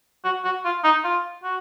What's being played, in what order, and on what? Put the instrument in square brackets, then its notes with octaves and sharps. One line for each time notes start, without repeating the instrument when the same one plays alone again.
[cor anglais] F#4
F#4
F4
D#4
F4
F#4